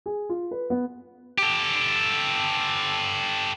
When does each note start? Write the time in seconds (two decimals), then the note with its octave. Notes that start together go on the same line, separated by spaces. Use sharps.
0.06 G#4
0.29 F4
0.51 B4
0.70 B3
1.38 G4 A4